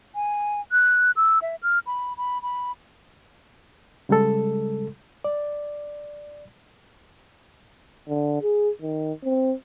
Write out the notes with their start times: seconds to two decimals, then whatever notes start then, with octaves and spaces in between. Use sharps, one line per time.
0.15 G#5
0.72 F#6
1.16 E6
1.42 E5
1.63 F6
1.87 B5
2.17 B5
2.42 B5
4.09 C#3 G3 G#3 A4
5.24 D5
8.08 D3
8.42 G#4
8.82 D#3
9.24 C4